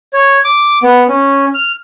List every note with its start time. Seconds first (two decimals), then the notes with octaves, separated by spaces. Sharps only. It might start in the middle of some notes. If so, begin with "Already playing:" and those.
0.13 C#5
0.44 D6
0.83 B3
1.08 C#4
1.54 F6